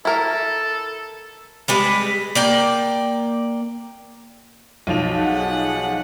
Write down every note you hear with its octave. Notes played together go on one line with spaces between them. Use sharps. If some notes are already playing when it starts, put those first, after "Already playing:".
E4 A4 A#4
G3 G#3 B4
A#3 D5 G5
B1 F3 F7
G#4 F#5